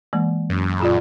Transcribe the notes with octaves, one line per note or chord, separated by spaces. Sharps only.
E3 G#3 A#3
F#2
A#2 F4 D5